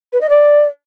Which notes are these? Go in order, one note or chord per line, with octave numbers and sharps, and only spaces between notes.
B4
D#5
D5